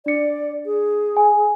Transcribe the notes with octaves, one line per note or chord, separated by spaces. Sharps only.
D4 D5 C#7
G#4
G#5